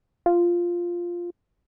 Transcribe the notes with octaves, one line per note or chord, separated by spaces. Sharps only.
F4